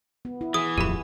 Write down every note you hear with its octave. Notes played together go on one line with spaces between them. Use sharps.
B3
E4
E3 G#4 D#6
D1 F2 G4 B5